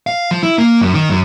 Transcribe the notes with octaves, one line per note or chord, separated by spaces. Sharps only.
F5
F3
E4
A#3
F#2
D#3
F#2